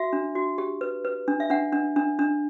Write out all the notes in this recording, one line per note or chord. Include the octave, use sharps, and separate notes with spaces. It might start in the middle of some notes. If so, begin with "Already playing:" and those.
Already playing: F#4 E5
D4
F#4
G4
B4
B4
D4
E5
D4 F#5
D4
D4
D4